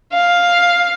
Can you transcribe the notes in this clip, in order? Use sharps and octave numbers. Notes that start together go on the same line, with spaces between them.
F5